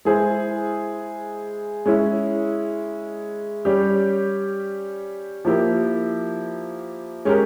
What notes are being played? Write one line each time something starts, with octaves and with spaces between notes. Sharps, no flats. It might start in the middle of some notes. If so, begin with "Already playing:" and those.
G#3 E4 G#4 C5
G#3 C#4 E4
G3 C#4 G4
F3 A#3 E4 G4
G#3 C#4 G4 A#4